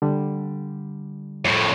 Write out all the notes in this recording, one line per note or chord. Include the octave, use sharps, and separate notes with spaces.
D3 G3
F2 A2